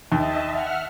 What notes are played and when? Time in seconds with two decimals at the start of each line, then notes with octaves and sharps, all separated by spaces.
0.12 D#2 D#5 E5 A5
0.51 E5 F#5 F6